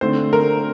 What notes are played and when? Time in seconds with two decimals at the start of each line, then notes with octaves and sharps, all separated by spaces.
0.01 D3 A3 C4 C5
0.33 A#4